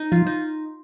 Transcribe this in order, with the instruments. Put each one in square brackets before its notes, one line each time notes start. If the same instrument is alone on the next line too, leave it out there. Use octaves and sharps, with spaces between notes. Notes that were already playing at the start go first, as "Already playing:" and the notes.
Already playing: [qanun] D#4
[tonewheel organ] F3 [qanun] F4
[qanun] D#4